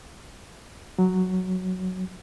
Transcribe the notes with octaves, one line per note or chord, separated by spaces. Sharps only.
F#3